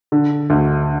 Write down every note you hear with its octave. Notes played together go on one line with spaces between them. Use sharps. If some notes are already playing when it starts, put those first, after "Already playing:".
D3
D2